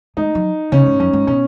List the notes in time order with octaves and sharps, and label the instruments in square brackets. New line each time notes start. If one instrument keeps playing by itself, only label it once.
[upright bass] G#3 [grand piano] D#4
[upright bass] F#3
[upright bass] C#3 [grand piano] C#4
[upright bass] G#2
[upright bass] F#2 [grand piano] C#4
[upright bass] G#2
[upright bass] B2 [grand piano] C#4